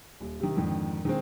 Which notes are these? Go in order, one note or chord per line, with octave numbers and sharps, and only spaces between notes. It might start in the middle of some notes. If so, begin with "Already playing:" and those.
D#1
C3 D#3
F2 G#2 D3 D#3
D#3 G#3 C4